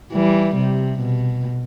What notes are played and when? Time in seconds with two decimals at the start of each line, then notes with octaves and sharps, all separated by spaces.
0.13 E3 G3
0.56 C3
0.99 B2